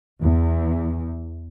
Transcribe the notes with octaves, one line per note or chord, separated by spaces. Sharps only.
E2